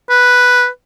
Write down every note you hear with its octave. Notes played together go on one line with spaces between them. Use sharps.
B4